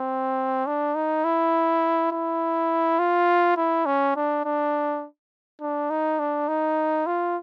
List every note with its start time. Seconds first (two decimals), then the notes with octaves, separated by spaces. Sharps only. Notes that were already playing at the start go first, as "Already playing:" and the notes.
Already playing: C4
0.67 D4
0.95 D#4
1.25 E4
2.12 E4
2.99 F4
3.57 E4
3.86 C#4
4.16 D4
4.45 D4
5.61 D4
5.90 D#4
6.19 D4
6.48 D#4
7.06 F4